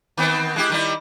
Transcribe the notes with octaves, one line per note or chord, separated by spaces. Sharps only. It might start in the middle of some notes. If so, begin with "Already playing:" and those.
D#3 B3 C4
G#3 E4 G4
D#3 G3 E4